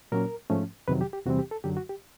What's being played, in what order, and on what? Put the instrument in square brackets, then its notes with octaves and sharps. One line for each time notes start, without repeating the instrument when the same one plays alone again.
[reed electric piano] A#2 F#3 A#3 C#4 A#4
G#2 F3 A3 C#4
F2 C3 D#3 F#3 B4
G4
G4
E2 C3 E3 G3 C4 F#4
G4
A4
F#2 D3 F#3 G4
F#4
G4